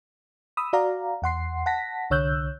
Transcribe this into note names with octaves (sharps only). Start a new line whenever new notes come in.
B5 D#6 E6
F#4 D5 F5 A#5
E2 F#5 C6 C7
F#5 A5 A#6 B6
C2 D3 C#5 E6 F#6 G6